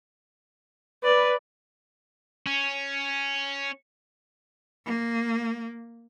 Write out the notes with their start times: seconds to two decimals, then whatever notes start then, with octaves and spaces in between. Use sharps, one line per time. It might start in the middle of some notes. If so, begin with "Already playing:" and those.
1.04 B4 D5
2.47 C#4
4.86 A#3